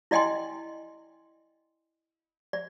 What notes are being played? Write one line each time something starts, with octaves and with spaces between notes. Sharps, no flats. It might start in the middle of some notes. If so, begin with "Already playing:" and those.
E4 D5 D#5 G5 G#5 C6
D5